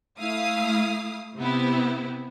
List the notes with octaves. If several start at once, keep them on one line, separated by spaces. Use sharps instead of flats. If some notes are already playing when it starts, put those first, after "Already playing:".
A3 E4 F5 D#6
C3 B3 C4 E4